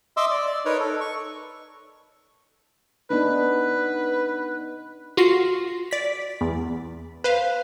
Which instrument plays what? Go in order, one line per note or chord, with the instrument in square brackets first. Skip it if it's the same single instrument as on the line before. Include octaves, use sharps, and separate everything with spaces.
[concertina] D#5 E5 C6 D6 E6
D5
D5
D#4 A#4 B4 C#5
A4
C#6
[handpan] B3 D4 D#4 [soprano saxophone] B4
[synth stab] F4 F#4 A#6 C7
D5 B6
E2
B4 C5 F5